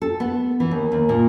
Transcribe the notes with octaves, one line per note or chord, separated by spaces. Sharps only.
A4
B3
E3
D#2
D#2
A#2